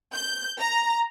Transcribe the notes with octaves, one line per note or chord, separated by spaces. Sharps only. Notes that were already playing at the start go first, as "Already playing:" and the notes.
G6
A#5